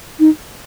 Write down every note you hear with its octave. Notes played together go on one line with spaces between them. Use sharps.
D#4